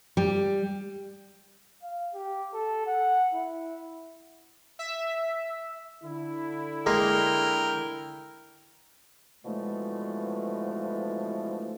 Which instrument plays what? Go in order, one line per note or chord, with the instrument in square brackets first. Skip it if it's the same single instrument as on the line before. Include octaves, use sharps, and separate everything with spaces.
[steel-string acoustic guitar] G3
[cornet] F5
G4
A4
F#5
E4
[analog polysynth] E5
[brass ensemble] D3 E4
[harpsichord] G#3 A#3 D#5 [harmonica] A#4 G5
[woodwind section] B2 D3 E3 F3 G#3 A3